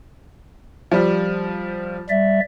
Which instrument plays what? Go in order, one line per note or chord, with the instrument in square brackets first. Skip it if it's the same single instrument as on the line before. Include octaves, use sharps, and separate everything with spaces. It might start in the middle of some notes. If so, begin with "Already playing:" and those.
[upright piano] F3 G3
[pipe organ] G3 D5 E5